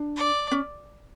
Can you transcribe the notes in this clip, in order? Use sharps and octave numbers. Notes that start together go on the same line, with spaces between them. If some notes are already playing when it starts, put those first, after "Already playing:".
Already playing: D4
D5
C#4